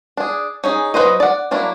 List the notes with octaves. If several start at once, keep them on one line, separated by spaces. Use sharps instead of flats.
D4 G#4
C#4 D#4 G#4
F#3 G#4 B4 C5 D#5
D5 F#5
F#3 A#3 D4 E4